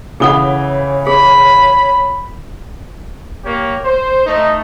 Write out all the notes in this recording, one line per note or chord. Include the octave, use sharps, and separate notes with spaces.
C#3 E3 G#4 A4 C#5 F#5 G7
G#4 B5
A#3 G4 C#5
C5
A3 D#4